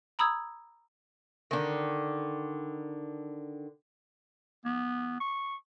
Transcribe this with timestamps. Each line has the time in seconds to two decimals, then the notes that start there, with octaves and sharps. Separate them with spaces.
0.19 A#5 B5 D#6 E6 G#6
1.51 D3 D#3
4.65 B3
5.20 C#6